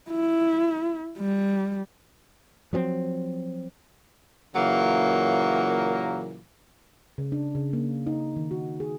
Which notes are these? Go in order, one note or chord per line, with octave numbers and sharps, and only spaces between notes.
E4
G3
F3 F#3 B3 C4
A#2 C#3 E3 F#3 A#3
C#3
D4
C#3
A#3
D#4
D#3
F#4
G#4